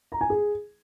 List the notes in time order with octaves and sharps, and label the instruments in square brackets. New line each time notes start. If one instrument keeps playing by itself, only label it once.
[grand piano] A#5
G#5
G#4